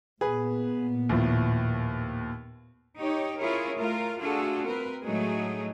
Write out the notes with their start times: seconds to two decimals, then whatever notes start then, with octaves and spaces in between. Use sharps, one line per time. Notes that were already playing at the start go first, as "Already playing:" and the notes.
0.21 A#2 B3 G#4 B4
1.09 D#2 A2 F3
2.99 D#4 G4 C#5
3.39 C#4 E4 F4 G#4 A#4 C#5
3.75 A3 F4 A#4
4.20 A3 D4 F4 F#4 G#4 A4
4.67 C4 A#4 B4
5.05 A2 F#3 G#3 A3 D#4 G#4